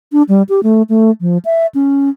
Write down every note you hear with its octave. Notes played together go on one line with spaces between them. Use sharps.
D4
G3
G4
A3
A3
F3
E5
C#4